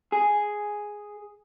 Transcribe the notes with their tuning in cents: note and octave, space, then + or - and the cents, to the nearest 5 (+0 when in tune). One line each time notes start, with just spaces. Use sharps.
G#4 +0